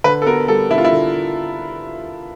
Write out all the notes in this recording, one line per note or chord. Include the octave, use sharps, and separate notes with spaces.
D3 B4
A4
B3 A#4
G3 A4
D3 E4
F4
E4
D3